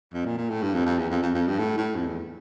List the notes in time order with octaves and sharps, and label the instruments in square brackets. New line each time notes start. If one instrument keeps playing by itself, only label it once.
[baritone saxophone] F2
A#2
A#2
A2
G2
F2
F2
E2
F2
F2
F2
G2
A2
A2
F2
E2